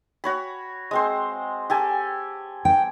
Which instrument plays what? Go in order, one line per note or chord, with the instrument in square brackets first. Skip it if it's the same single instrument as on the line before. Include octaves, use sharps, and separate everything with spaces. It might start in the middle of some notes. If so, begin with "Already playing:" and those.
[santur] F#4 C#5 B5
G#3 C4 C5
G4 A4 G#5
[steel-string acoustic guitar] G5